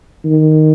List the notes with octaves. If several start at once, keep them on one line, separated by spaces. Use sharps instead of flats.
D#3